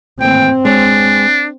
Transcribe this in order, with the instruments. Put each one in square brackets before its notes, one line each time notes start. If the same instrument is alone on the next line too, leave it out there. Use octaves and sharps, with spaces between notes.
[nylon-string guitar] D#2 A2 E3 [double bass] C4 [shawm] G5
[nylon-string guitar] G#3 C#5 [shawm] D4